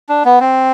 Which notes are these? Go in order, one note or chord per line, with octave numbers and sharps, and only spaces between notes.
D4
B3
C4